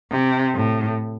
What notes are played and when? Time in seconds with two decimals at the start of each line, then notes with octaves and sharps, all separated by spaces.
0.11 C3
0.56 A2